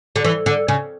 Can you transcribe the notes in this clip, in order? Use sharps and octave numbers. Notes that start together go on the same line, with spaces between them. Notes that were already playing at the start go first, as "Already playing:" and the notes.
D3
E3
D3
C#3